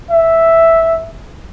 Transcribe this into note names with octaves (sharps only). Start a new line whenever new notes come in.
E5